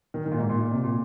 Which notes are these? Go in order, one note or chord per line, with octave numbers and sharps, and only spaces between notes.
D#3
D#3
A#2
G#2
A#2
A#2
C3
A#2